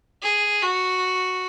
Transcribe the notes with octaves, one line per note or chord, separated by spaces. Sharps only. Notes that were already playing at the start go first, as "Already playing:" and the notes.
G#4
F#4